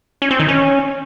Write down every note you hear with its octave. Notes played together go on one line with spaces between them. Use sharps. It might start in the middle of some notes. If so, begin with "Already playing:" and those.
C#4
C4
D#3
C#4